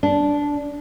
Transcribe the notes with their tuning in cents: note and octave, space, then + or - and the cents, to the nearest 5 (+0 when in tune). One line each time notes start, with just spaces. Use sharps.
D4 -10